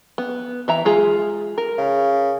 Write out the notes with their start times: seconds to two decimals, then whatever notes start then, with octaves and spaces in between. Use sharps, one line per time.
0.18 B3
0.68 E3 E5 A#5
0.85 G#3 F4 G#4
1.58 A#4
1.78 C#3